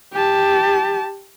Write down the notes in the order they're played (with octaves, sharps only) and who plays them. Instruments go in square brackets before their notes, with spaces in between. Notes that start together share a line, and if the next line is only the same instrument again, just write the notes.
[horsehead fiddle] G4 A5